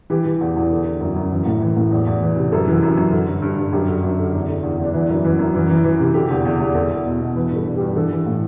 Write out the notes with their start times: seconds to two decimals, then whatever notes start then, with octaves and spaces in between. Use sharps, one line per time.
0.10 E3 G4
0.25 E3
0.41 E2
0.56 E2
0.71 D3
0.87 D3
1.00 F#2
1.16 F#2
1.31 E3
1.46 A2
1.61 E3
1.77 A2
1.91 E2
2.07 E2
2.22 E3
2.37 C3
2.52 F#2 A4
2.68 E3
2.83 F#2
2.97 F#2
3.12 D3
3.27 G2
3.42 G2
3.58 G2
3.72 F#2 G4
3.88 D3
4.04 F#2
4.19 D3
4.33 E2
4.48 D3
4.63 E2
4.78 E2
4.84 D4
4.93 E3 E4
5.09 F#2
5.25 E3
5.39 F#2
5.55 E3
5.70 E3
5.84 E3
6.00 C3
6.14 D3 G4
6.30 E2
6.45 E2
6.60 E2
6.74 E2 A4
6.90 E2
7.05 B2
7.21 B2
7.35 E3 B4
7.50 G2
7.56 A4
7.66 G2
7.76 G2 G4
7.95 E3 A4
8.11 E3
8.26 A2